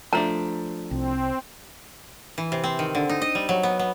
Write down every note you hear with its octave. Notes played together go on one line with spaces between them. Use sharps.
F3 A3 D4 A#5
C2 C4
E3
C3
C4
D#3
D3
D#4
D#5
G3
F#3
B3
B3